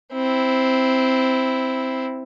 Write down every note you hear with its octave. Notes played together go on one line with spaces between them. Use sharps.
C4 E4